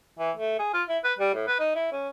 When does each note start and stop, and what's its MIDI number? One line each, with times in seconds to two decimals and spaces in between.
0.19 0.31 52
0.37 0.58 57
0.59 0.71 68
0.74 0.83 65
0.89 0.98 64
1.04 1.14 71
1.19 1.31 55
1.35 1.46 45
1.47 1.59 71
1.59 1.75 63
1.75 1.87 64
1.92 2.09 61